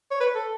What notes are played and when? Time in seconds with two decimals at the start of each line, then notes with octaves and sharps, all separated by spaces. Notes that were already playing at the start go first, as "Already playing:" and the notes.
0.11 C#5
0.20 B4
0.35 A4